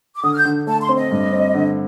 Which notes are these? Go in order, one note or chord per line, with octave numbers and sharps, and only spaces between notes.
D6
D3 D#6
F6
G6
D3
A3 A5
C6
C4
D#5
G2
C4
D3